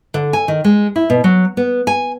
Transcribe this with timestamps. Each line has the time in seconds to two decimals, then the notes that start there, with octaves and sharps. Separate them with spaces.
0.14 D3
0.33 G#5
0.48 D#3
0.65 G#3
0.96 E4
1.10 B2
1.24 F#3
1.57 B3
1.87 G#5